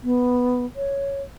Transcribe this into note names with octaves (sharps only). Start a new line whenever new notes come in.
B3
C#5